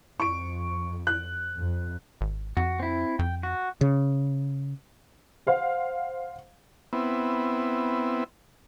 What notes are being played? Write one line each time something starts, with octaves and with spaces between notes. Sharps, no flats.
F2 C#6 D7
F#6
F2
G#1
F2 F#4
C4 E4
F2 G5
F#4
C#3
C5 F5 F#5
B3 C4 E4